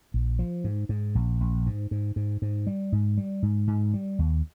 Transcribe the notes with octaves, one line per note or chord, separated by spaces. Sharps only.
A#1
F3
G#2
G#2
A#1
A#1
G#2
G#2
G#2
G#2
G3
G#2
G3
G#2
G#2
G3
D#2